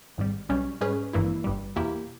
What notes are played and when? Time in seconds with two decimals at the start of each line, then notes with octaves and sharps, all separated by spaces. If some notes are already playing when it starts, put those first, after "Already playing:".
0.18 G#1 G#2 G3
0.49 B1 B2 G3 C#4
0.81 G#2 G3 C#4 G#4 B4
1.13 G#1 G2 E3 A#3 E4
1.44 G1 G2 G3
1.76 E2 B2 A#3 E4 G4